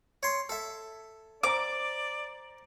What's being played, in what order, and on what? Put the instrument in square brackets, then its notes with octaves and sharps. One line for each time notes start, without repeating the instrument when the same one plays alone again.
[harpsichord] C#5 C6
A4 E5
[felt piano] C5 A#5 [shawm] D5 [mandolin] D6